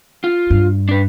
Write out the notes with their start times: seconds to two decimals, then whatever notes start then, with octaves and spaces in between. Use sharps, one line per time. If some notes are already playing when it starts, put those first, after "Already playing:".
0.24 F4
0.50 G2
0.89 D4 B4